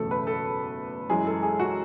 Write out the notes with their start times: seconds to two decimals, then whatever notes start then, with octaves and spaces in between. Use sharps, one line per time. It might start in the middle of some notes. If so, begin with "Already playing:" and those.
Already playing: F#1 E2 B2 A3 A4
0.11 B4
0.27 A4
1.09 F#2 E3 G#3 G#4
1.27 A4
1.42 G#4
1.60 F#4